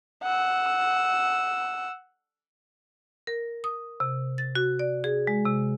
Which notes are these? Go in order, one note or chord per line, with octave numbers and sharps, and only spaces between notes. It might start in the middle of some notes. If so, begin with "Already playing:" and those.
F#5 E6
A#4
D#6
C3
A6
F#4
D5
G#4
G#3
C3